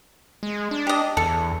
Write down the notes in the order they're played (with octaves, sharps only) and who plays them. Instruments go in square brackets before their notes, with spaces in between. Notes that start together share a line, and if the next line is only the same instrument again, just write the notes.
[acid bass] G#3
D4
[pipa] G4 D#5
[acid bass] E2 [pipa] A4